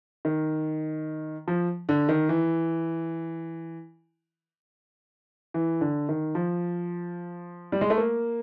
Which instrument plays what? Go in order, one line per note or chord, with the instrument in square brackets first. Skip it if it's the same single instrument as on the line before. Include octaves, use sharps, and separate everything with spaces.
[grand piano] D#3
F3
D3
D#3
E3
E3
D3
D#3
F3
G3
G#3
A3
A#3